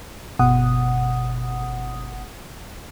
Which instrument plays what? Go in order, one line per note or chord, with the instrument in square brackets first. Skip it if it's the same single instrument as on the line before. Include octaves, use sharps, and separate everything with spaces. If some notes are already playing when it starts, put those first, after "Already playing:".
[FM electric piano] G1 B2 F#5 D#6